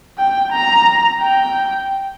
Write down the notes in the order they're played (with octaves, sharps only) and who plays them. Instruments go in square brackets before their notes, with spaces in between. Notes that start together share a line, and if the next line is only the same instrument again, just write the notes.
[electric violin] G5
A#5
G5